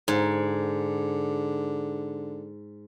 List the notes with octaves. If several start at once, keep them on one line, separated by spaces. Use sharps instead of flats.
G#2 D3